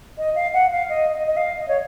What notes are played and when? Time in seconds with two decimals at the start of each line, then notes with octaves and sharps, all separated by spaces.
0.18 D#5
0.35 F5
0.54 F#5
0.71 F5
0.89 D#5
1.13 D#5
1.27 D#5
1.37 F5
1.61 D#5
1.68 C#5